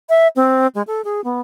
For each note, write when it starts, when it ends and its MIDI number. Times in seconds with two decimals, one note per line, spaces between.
0.09 0.28 76
0.36 0.67 60
0.75 0.82 56
0.87 1.02 69
1.05 1.21 68
1.24 1.41 59